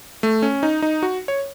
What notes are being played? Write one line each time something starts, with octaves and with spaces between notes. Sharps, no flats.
A3
C#4
D#4
D#4
F#4
C#5